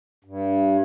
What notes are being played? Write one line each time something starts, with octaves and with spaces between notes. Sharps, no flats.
G2